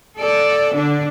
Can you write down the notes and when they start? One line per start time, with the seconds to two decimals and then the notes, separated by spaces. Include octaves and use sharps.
0.18 A4 D5
0.73 D3 D4